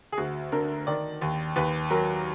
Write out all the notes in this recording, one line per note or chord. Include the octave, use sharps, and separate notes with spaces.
G#4
D2 F#4
D3 A#4
D#3 D5
D#2
D#2 B4
F#3 A#4